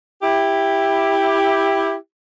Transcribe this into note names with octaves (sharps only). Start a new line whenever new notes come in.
E4 G4